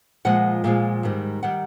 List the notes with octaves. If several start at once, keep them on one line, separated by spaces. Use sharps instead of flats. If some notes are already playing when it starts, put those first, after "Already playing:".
A#2 F3 G#3 F#5
A#2 F3 G#3 F5
G#2 D#3 G3
D#3 G3 F#5